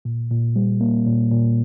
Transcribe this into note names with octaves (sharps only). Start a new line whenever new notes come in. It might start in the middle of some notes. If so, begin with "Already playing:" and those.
A#2
A#2
G3
A#3
A#2
A#2